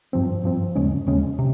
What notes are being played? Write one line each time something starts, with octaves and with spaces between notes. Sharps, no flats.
G2 F3 C4
G2 F3 C4
D#2 C#3 G#3 C#4
D#2 C#3 G#3 C#4
C3